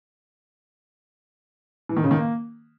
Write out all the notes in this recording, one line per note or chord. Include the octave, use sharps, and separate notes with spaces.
E3
D#3
C#3
D#3
A#3